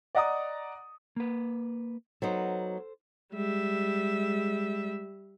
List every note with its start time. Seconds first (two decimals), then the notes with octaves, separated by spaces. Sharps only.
0.15 D5 D#5 F#5 A#5 D#6
1.16 A#3 B4
2.22 F#3 B3 D#4 A4 C5
3.33 G3 G#3 E5